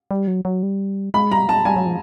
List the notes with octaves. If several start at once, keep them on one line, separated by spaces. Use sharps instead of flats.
G3
F#3
F#3
G3
G#3 B5
G3 A#5
A5
G3 G#5
F#3
F3